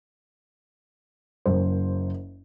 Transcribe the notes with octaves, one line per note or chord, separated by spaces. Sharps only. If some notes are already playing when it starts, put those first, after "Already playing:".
F#1 F#2 C5